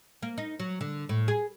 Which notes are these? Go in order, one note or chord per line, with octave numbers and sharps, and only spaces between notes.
A#3
D#4
F#3
D3
A2
G#4